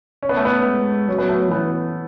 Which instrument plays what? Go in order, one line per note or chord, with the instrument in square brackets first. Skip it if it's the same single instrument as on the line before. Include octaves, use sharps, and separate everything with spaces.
[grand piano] C#4
B3
A3
B3
[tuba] G#3
[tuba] F#3 [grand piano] C#4
[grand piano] B3
A3
C#4
[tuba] E3 [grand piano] B3